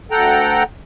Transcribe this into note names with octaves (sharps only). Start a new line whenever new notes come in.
D2 A4 F#5 G5 A#5